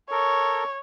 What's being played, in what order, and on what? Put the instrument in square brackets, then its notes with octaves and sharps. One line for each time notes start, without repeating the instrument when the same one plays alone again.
[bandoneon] A4 A#4 [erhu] C#5